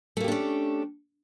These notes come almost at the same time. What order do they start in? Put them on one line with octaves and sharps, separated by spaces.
A3 A#3 G4 D4 C#4